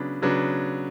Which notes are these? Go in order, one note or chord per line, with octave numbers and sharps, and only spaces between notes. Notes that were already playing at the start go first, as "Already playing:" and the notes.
Already playing: C#3 F#3 B3 D4
C#3 F#3 B3 D4